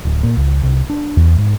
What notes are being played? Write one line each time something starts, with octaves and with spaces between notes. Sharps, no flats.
D1
A#2
C#2
C2
D4
E2
G#2